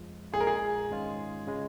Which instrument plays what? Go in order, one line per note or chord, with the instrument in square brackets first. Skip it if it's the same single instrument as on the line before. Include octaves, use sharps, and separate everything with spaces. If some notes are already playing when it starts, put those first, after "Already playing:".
Already playing: [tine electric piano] F2 F3 G#3 F4
[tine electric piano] A#1 A#2 G#3 F4 [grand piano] G#4
[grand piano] A#4
G#4
[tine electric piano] G#1 G#2 G#3 C#4 F4
C#3 G#3